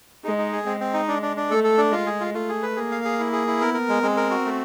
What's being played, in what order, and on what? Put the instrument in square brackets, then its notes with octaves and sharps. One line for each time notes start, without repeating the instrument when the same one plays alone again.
[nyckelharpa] G#3 [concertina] D#4
[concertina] D#4
G#4
[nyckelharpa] G#3 [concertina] C4
[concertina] C4
D#4
D4
D4
D4
[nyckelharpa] A3 [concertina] A4
[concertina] A4
D4
[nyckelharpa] G#3 [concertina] F4
[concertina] G#4
F4
[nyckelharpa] A3 [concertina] F4
[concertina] G#4
B4
[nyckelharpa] A#3 [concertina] G#4
[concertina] F5
G#4
E4
G#4
E4
[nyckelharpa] B3 [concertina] A#4
[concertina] A#4
G#3
[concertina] G#3 [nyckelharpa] C4
[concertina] A#4
F#4
A3